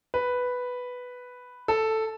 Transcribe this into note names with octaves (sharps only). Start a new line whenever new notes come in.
B4
A4